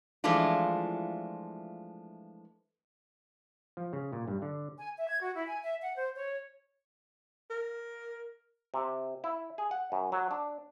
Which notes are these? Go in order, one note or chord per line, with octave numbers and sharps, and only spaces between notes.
E3 F3 G#3 A3 D4 F4
F3
C#3
A#2
G2
D3
G#5
E5
G#6
F#4
E4
G#5
E5
F#5
C5
C#5
A#4
C3
E4
G#4
F#5
F#2
F#3
D4